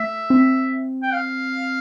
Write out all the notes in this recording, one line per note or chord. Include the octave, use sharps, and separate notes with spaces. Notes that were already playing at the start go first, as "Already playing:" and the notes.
Already playing: A3 E5
C4
G5
F5